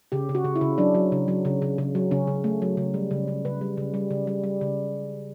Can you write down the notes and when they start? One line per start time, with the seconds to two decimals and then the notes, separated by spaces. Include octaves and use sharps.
0.12 C#3 G4
0.29 C#3
0.35 F#4
0.45 C#3
0.56 E4
0.61 C#3
0.78 F#3 D4
0.94 F#3
1.12 C#3
1.28 F#3
1.45 C#3
1.62 C#3
1.78 C#3
1.95 F#3
2.11 C#3 C#4
2.27 C#3
2.44 A3
2.62 F#3
2.77 C#3
2.94 G3
3.11 C#3
3.28 C#3
3.45 C#3 B4
3.61 G3
3.77 C#3
3.94 G3
4.11 C#3
4.27 G3
4.44 G3
4.61 C#3